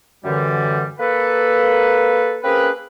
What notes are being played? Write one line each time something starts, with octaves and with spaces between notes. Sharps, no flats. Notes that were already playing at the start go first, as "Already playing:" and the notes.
F#2 D3 E3 G3
A#3 A4 B4
A#3 C4 C#4 G#4 A#4 B4